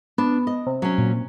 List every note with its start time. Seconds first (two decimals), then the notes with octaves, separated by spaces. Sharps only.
0.18 B3 D4
0.47 D#5
0.67 C3
0.82 F#3 C#4
0.98 A#2